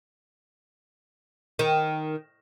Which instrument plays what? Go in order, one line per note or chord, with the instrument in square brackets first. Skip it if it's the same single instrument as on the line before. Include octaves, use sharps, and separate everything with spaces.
[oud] D#3